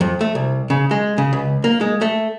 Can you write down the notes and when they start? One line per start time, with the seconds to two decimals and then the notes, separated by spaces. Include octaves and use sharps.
0.01 F2
0.21 A3
0.35 C2
0.70 C#3
0.91 G#3
1.18 C#3
1.33 C#2
1.64 A#3
1.81 G#3
2.02 A3